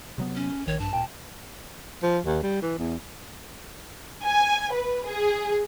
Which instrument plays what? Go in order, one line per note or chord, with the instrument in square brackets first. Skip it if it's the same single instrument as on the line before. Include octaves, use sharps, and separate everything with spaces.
[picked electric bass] C3 F#3 B3
[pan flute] C#4
[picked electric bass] A#1 [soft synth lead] D#3 [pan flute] C#5
[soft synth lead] G2 [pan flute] A5
[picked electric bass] D1 A#2 [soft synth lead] G5
[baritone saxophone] F3
D#2
G3
E3
E2
[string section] G#5
B4
G#4